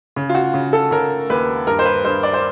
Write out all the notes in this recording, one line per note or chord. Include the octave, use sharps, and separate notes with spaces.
C#3
F4
F#4
C#3
A4
C#3 A#4
D#2 B4
G2 A#4
C5
B4
G2 C5
D5
C5